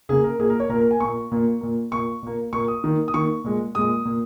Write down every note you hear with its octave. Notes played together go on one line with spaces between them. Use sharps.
C#3 A#3 G#4
A#4
A#2 A#3 G#4
A#4
C#5
A#2 A#3 A#4
A#4
G#5
A#2 A#3 C#6
A#2 A#3
A#2 A#3
A#2 A#3 C#6
A#2 A#3
A#2 A#3 C#6
D#6
D#3 A#3
D#6
D#3 A#3 C#6
A#2 G#3
A#2 G#3 D#6
A#2 A#3